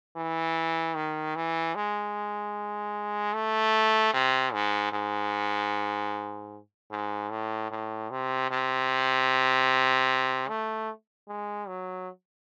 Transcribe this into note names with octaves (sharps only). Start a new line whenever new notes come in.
E3
D#3
E3
G#3
A3
C3
G#2
G#2
G#2
A2
A2
C3
C3
A3
G#3
F#3